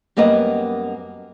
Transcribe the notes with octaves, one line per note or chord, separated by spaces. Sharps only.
F#2 G3 A#3 B3 D#5